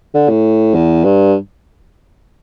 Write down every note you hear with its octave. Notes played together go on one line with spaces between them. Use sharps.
D3
A2
E2
G2